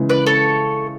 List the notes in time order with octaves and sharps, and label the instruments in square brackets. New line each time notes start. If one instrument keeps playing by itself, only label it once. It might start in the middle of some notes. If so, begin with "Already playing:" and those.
Already playing: [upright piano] C#3 E3 G#3
[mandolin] B4 D5
A4 C#5